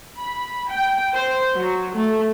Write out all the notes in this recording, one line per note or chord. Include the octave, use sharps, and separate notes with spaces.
B5
G5
C5
F#3
A3